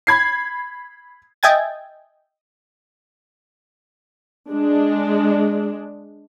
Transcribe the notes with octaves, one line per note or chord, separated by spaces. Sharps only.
B5 G#6 C7
D#5 E5 G5 G#5 G#6 A6
G#3 D4